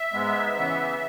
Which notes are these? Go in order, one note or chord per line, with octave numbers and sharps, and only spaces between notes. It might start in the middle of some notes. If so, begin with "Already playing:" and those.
Already playing: E5
G#2 G#3 B3
C#3 E3 B3